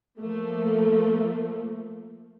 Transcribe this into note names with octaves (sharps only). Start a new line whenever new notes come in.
F3 A3 A#3